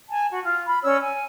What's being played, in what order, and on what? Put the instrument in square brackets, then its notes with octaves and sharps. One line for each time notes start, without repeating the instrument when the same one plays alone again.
[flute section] G#5 A5
F#4
F4
B5
C#4 C#5 D5 E6
G#5